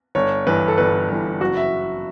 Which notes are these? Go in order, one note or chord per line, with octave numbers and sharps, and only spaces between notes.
G1 C#5
G2 E3 B4
A4
G1 B4
G2 E3
F#1 F#4
E5